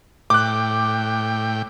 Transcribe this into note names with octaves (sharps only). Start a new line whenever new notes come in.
A2 G5 D6 F#6